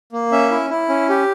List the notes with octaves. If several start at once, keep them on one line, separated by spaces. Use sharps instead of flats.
A#3
C#4 E5
E4
E4
C#4
G4